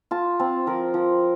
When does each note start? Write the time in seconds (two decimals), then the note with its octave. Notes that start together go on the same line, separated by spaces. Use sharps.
0.11 F4 A5
0.39 C4 A5
0.67 F3 A#4
0.94 F3